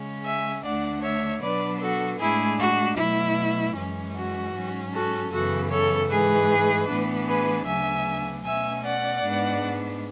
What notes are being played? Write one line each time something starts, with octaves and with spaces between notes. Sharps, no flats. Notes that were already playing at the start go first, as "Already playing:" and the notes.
Already playing: C#3 G#3 C#4
E5 G#5
D2 D3 A3 D4 D5 F#5
C#5 E5
B2 F#3 B3 D4 B4 D5
F#4 A4
A2 G#3 D4 E4 G#4
F#4
B2 F#3 A3 E4
F#2 E3 G#3 C#4
F#4
G#2 F#3 C#4
F#4 A4
F#2 C#3 E3 B3 F#4 A4
A4 C#5
G#2 E3 G#3 G#4 B4
A2 E3 B3 D4
G#4 B4
D2 C#3 F#3 B3 D4 E5 G#5
B2 A3 C#4 E5 G#5
D5 F#5
G#2 G#3 B3 D4